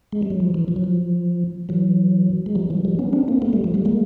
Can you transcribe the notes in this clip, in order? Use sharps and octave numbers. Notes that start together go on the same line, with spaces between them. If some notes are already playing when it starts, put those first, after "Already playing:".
G#3
G3
F#3
F3
E3
F3
F#3
F3
E3 F#3
G#3
F3 G3
E3 F#3
F3 G3
B3 C#4
C4 D4
A#3 C4
A3 B3
G3 A3
F3
G3 A3
G#3 A#3